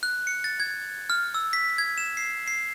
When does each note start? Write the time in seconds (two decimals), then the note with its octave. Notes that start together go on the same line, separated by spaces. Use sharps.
0.03 F#6
0.27 C#7
0.44 A6
0.60 G#6
1.10 F6
1.34 E6
1.53 B6
1.78 G#6
1.98 E7
2.17 C7
2.48 C7